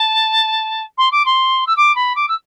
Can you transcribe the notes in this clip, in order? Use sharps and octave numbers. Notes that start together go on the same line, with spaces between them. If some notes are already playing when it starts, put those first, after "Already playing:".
Already playing: A5
C6
D6
C6
E6
D6
B5
D6
E6